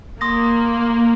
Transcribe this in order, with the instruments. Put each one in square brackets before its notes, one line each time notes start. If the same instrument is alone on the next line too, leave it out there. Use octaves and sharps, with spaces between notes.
[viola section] A#3 [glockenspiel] C6 D#6 A#6